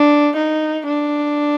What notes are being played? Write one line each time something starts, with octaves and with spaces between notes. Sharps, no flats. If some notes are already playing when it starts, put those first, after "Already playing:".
Already playing: D4
D#4
D4